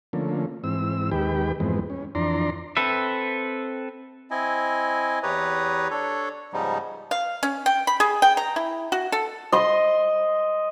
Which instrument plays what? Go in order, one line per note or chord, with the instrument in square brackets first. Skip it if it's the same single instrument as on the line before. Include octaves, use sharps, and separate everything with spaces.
[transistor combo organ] D3 F3 A3 A#3 C#4
G#2 E3 C4 E6
D#2 D#3 G#3 G4 B4 G5
F2 G#2 E3 G#3 B3 C4
C#4
F2 E3 D4 D5 A#5 C6
[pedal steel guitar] C4 A4 B4 E5
[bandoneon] C4 E4 D#5 G#5
E2 G4 B4 C#5 A#5 D#6
D4 A4 C#5
G#2 C#3 F3 G3 B3 D#4
[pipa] F5
C#4
G5
B5
G#4
G5
A#5
E4
F#4
A4
[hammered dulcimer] D#5 C6